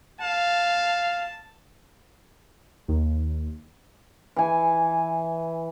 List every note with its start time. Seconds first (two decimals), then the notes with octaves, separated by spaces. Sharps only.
0.21 F5 A5
2.88 D#2
4.36 E3 G#5